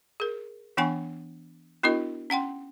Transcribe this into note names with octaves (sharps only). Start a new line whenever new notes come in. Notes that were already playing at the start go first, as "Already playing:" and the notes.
G#4 A#4
E3 B3 D4 F#5 G#5 C#6
B3 D4 E4 F#4 A#4 D#5
C#4 F#5 G5 C6